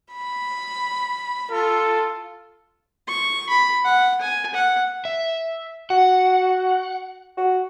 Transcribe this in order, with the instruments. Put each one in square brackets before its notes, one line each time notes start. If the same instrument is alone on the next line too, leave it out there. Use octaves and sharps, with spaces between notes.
[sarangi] B5
[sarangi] F4 [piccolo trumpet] A4
[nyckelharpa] C#6
B5
F#5
G#5
F#5
[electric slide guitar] E5
[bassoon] F#4 [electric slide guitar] F#5
[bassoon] F#4